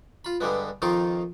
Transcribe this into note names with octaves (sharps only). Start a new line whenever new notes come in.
F4 B5
G2 D3 G3 G#3 B3
F2 D#3 D#4 F4 C6 D6